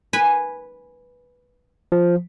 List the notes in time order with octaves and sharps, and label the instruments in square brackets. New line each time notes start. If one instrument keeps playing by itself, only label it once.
[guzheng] B4 G#5 B5
[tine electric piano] F3